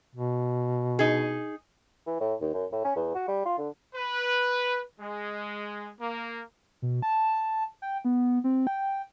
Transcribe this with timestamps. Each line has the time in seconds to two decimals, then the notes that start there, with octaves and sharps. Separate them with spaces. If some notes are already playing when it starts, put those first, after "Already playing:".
0.15 B2
0.99 D#4 G#4
2.07 E3
2.20 A2
2.41 D#2
2.54 F#2
2.72 A2
2.85 C#4
2.96 E2
3.15 F#4
3.28 G3
3.45 F4
3.58 D3
3.95 B4
5.01 G#3
6.01 A#3
6.82 B2
7.02 A5
7.82 G5
8.05 B3
8.44 C4
8.67 G5